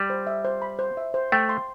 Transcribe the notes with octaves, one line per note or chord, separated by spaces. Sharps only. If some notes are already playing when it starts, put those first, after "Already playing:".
Already playing: G3 B5
C5
E5
C5
B5
C5
E5
C5
A3 G5
C6